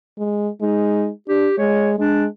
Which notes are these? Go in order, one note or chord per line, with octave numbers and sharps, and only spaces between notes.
G#3
G#3 D#4
D4 G4
G#3 C#5
G#3 D4